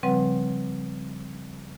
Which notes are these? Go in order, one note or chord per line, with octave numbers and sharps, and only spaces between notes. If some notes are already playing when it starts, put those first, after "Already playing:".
C#3 F3 G3 C4 B4 F#5